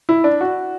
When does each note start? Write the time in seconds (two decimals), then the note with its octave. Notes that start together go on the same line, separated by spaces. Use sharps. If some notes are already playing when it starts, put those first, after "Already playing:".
0.09 E4
0.24 D4
0.41 F#4